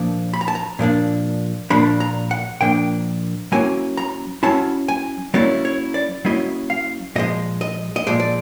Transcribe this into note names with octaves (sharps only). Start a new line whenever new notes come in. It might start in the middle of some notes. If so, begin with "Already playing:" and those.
Already playing: A#2 F3 A#3 D4
B5
A#5
A5
A#5
A#2 F3 A#3 D4
A#2 F3 A#3 D4 B5
A#5
F#5
A#2 F3 A#3 D4 G5
F#3 A#3 C#4 E4 G#5
A#5
F#3 A#3 C#4 E4 A5
G#5
F#3 A#3 C#4 E4 D5
C#5
D5
F#3 A#3 C#4 E4 D#5
F5
A#2 F3 G#3 D#5
D#5
D#5
A#2 F3 G#3 D5
D5